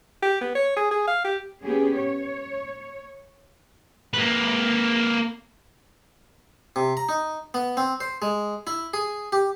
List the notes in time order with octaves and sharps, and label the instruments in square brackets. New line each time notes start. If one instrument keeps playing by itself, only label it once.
[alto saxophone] G4
B3
C#5
G#4
G#4
F5
G4
[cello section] B3 C#4 G4 G#4
C#5
[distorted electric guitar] A#3 B4
[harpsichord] C3
A#5
D#4
B3
C4
C5
G#3
E4
G#4
G4